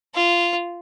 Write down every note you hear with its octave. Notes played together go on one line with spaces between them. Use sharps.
F4